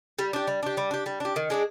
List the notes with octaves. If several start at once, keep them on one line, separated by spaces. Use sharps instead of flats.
G3
D4 G4
G3
D4 G4
G3
D4 G4
G3
D4 G4
D#3
G#3 D4 G#4